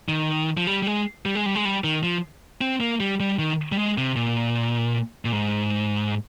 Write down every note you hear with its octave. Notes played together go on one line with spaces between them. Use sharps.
D#3
F3
G3
G3
G#3
G3
G#3
G3
G#3
G3
D#3
F3
C4
A#3
G3
G3
D#3
G3
G#3
C3
A#2
A#2
G#2